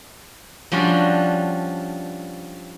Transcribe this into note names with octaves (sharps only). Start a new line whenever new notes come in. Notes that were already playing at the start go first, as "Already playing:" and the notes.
F3 G3 C#4 D4 F#4